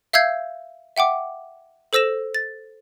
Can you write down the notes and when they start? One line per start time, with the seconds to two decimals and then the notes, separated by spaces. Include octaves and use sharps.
0.13 E5 F5 E6 G6 G#6 C7
0.97 E5 F#5 G5 D6
1.93 A4 C5 E6 A#6 E7
2.35 A6